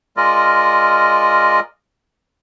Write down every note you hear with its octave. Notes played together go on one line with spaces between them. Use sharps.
G#3 F4 A#4 D5 D#5